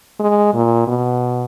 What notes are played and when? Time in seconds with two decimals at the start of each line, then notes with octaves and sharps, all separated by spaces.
0.20 G#3
0.54 A#2
0.87 B2